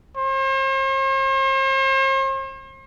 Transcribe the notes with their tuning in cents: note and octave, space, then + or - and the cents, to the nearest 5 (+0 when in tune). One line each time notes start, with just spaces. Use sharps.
C5 +45